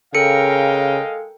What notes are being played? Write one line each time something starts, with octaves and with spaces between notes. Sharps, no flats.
C#3 G#3 A4 A#4 D#5 F5 G5 C#7